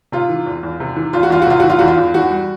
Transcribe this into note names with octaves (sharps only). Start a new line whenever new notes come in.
C3 F4
E3
E2
E2
C3
E3
E2 F4
F#4
E2 F4
F#4
C3 F4
E3 F#4
F4
E2 F#4
F4
E2
E3 F#4
G3